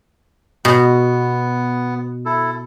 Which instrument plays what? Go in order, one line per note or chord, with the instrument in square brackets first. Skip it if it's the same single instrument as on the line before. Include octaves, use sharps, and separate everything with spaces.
[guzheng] B2 [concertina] B3
[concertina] E4 A4